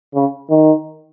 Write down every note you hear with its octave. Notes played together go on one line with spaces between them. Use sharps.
C#3
D#3